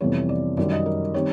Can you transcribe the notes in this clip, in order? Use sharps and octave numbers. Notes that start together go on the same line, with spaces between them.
F2 C3 E3 G3 B3 C#5
D5
F#2 D#3 G3 D5
D#5
A#4
D#3 G3 C4 D#4 C#5